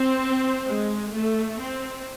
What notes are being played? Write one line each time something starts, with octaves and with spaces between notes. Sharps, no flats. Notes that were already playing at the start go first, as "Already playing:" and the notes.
Already playing: C4
G#3
A3
C4